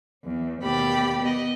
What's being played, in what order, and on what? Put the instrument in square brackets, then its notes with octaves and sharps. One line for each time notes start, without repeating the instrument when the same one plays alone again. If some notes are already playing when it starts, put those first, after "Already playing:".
[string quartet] E2
D#2 B2 G4 D5 B5
B3 D#5